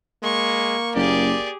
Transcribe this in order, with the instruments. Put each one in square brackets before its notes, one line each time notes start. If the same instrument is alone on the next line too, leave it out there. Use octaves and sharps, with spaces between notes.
[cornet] G#3 [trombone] A#3 [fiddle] C#6
[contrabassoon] F#1 [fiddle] G4 G#4 [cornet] D5